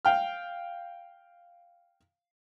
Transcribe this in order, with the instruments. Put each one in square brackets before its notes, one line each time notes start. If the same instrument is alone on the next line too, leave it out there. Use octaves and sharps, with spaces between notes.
[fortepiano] F5 G5 F6